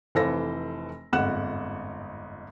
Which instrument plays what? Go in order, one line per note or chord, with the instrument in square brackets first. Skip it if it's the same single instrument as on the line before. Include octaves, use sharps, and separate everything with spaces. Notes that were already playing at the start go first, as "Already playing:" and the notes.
[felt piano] F1 E3 A4 C5 F5 A#6
G1 F2 G#2 F#5 F#6 E7